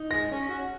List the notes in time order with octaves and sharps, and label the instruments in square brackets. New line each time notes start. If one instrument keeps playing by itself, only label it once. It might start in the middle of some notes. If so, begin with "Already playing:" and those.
Already playing: [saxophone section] D#4
[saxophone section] G#3 [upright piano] A#6
[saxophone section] C#4
F#4